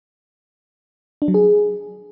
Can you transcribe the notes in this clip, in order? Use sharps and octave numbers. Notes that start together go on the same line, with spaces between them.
D4
F#3
G#4